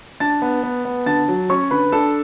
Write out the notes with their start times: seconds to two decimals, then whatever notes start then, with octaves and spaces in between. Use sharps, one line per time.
0.20 D4 A5 A6
0.42 B3
0.63 B3
0.85 B3
1.06 D3 A5 A6
1.28 F#3
1.50 C#4 C#5 C#6
1.71 D3 B4 B5
1.92 D4 A4 A5